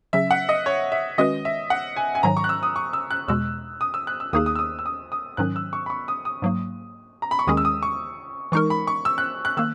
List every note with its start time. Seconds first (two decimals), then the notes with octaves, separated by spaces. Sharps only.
0.13 C#3 F#3 C#4 E5
0.31 F#5
0.49 D#5
0.66 C#5
0.92 E5
1.18 D#3 G#3 C#4 F#4 B4 D#5
1.45 E5
1.70 F#5
1.97 G#5
2.15 G#5
2.23 G#2 D#3 F#3 A#5
2.37 C#6
2.44 F#6
2.49 E6
2.63 D#6
2.76 C#6
2.93 E6
3.11 F#6
3.28 E2 B2 G#3 E6
3.81 D#6
3.94 E6
4.07 F#6
4.20 E6
4.33 D#2 D#3 A#3 D#4 G#4 D#6
4.46 D#6
4.55 E6
4.59 D#6
4.79 E6
4.86 D#6
5.12 D#6
5.37 G#2 D#3 F#3 C#4 F#6
5.56 E6
5.73 C#6
5.86 B5
5.90 C#6
6.08 D#6
6.25 D#6
6.42 G#2 F#3 A#3
7.22 A#5
7.31 B5
7.39 C#6
7.47 D#2 D#3 G#3 C#4 G#4 D#6
7.57 E6
7.65 D#6
7.83 C#6
8.52 E3 G#3 D#4 A#4 C#6
8.70 B5
8.87 C#6
9.05 E6
9.18 F#6
9.45 F#6
9.57 D#3 A#3 E6